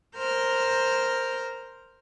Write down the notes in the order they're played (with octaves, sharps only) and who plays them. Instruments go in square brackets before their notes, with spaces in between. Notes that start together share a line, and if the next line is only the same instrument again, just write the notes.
[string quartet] A#4 C5 F6 G6